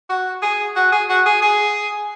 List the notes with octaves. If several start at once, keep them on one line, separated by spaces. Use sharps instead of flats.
F#4
G#4
F#4
G#4
F#4
G#4
G#4